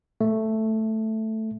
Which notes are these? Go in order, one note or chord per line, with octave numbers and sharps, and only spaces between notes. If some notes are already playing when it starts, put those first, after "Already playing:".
A3